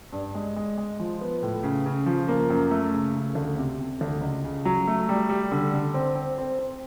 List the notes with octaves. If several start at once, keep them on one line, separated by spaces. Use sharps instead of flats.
G2
G#3
G#3
G#3
F3
B3
A2
C#3
C#3
F3
A#3
F#2
A3
C#3
C#3
D2
C3
C3
D2
C#2
C#3
F#3
A3
G3
G3
D3
D3
C4
C4
C4
C4